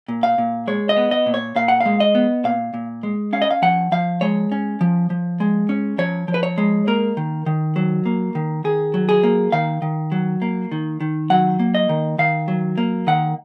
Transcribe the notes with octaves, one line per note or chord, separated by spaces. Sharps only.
A#2
F5
A#2
G#3 C#5
D#5
B3
D#5
A#2
C#5
A#2 F5
F#5
F5
G#3
D#5
B3
A#2 F5
A#2
G#3
C#4 F5
D#5
F5
F3 F#5
F3 F5
G#3 C#5
C#4
F3
F3
G#3
C#4
F3 C#5
F3
B4
C#5
G#3
A#3 A#4
D#3
D#3
F#3
A#3
D#3
D#3 G#4
F#3
G#4
A#3
D#3 F5
D#3
F#3
A#3
D#3
D#3
F#3 F#5
A#3
D#5
D#3
D#3 F5
F#3
A#3
D#3 F#5